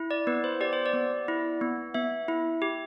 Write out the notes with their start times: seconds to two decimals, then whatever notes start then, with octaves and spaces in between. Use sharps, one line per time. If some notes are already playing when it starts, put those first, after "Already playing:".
Already playing: E4
0.11 D5
0.27 B3 B4
0.44 C5
0.61 G4 D5
0.73 C5
0.86 D5
0.94 B3
1.28 E4
1.61 B3
1.94 B3 E5
2.28 E4
2.62 G4